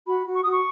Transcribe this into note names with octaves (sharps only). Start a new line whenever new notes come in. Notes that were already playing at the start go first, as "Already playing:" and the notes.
F#4 B5
F#4
C#6
F#4 D#6
C#6